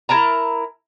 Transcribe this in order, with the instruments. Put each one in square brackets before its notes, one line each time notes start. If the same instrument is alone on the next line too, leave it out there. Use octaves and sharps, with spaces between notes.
[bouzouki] E4 A#4 A5 A#5